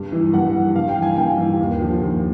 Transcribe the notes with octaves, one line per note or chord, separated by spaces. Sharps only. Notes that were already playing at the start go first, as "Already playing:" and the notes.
Already playing: G2
E3
G2 F#5
E3
G2 F5
G5
E3
G#5
G2 G5
E3
D#2
D3 F3
D#2